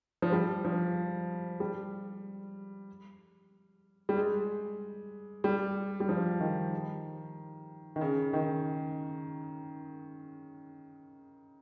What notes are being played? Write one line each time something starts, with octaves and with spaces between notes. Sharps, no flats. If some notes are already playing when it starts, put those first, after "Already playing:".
F3
G3
F3
G3
G3
G#3
G3
G3
F3
D#3
D#3
C#3
D#3